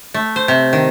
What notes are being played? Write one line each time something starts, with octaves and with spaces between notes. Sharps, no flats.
A3
C5
C3
D#3